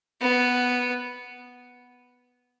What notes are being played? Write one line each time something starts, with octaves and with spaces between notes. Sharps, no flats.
B3